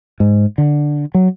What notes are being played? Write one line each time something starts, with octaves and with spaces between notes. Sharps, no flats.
G#2
D3
F#3